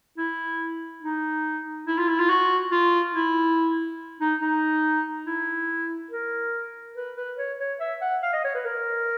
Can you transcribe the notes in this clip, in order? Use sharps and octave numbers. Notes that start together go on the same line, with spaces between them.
E4
D#4
E4
F4
E4
F4
F#4
F4
E4
D#4
D#4
E4
A#4
B4
B4
C#5
C#5
E5
F#5
F5
D#5
C#5
B4
A#4